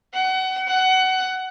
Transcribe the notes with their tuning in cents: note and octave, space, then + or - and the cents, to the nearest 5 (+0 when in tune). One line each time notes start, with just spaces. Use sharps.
F#5 +30
F#5 +20